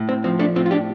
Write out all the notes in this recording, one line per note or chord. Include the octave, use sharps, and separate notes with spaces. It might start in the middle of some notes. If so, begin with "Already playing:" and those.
Already playing: A2
C4
F3 C4
A3 D4
A2 C4 F4
F4
D4 G4